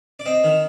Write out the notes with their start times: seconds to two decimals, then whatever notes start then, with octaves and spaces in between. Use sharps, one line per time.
0.19 D5
0.26 C4 D#5
0.44 D#3